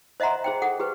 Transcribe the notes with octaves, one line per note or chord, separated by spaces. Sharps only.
C5 D#5 E5 F#5 A#5 C6
G#4 C5 G5
G#4 A4 F#5
G4 G#4 B4